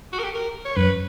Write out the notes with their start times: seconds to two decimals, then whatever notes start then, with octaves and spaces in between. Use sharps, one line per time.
0.13 F#4
0.19 A#4
0.24 G4
0.35 A#4
0.65 C#5
0.77 F#2 B4